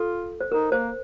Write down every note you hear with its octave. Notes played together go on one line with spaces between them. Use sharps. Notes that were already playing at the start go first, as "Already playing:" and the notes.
Already playing: F4 A4
C5
D#4 A#4
A#3 C5